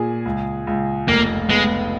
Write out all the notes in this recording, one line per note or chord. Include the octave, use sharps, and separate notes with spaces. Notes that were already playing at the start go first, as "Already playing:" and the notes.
Already playing: A#2 G#4
C#2
C#2
F1 A#3
G#3 B3